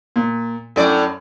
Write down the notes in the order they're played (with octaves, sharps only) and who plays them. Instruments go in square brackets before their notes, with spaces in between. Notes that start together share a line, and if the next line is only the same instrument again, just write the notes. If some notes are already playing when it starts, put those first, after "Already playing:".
[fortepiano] A#2
[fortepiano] F#2 [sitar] A2 D5